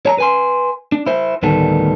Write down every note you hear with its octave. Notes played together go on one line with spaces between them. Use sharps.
C#5 A5 A#5
B4 G#5 C6
D4
E4 C5
D2 A2 D#3 G3 B3 A4